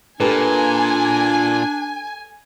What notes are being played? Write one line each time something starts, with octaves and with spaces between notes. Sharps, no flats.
A#2 D4 G4 A4 B4 G#5